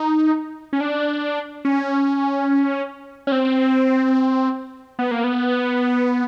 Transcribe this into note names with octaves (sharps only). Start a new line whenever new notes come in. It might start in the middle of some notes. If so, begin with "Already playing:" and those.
Already playing: D#4
C#4
D4
C#4
C#4
C4
B3
A#3
B3